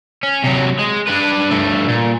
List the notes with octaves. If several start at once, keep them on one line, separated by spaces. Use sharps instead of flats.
C#4
C3 F#3
G#3
D4 B4
G2 A3
A#2